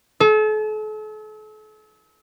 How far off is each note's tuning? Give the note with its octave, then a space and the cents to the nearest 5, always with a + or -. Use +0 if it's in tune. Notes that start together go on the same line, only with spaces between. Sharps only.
A4 -40